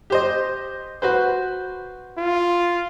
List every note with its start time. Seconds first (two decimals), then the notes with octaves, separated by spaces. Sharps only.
0.10 G4 C5 D#5
1.02 F#4 B4 C5
2.18 F4